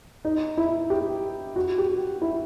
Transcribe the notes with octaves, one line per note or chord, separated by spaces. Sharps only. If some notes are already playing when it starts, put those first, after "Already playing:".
D#4
E4
G4
F#4
G4
E4